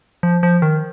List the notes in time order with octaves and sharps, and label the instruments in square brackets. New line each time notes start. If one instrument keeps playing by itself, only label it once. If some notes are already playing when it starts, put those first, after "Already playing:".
[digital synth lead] F3
F3
D#3